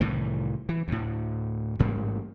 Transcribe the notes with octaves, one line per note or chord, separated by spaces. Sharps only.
C2 A2 D#3 E3
E3
D2 A2
A1 G#2 G3 A#3